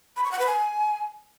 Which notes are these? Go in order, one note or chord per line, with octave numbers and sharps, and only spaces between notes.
B5
C#6
F#5
B4
G#5